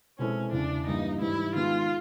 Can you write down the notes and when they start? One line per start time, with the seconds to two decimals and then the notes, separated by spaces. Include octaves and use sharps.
0.18 B2 G#3 C4 C#4 E4 A4
0.52 E2 C#3 E3 D4
0.87 G2 E3 G3 A#3 D#4
1.21 G#2 E3 G3 E4
1.55 D#3 G#3 B3 F4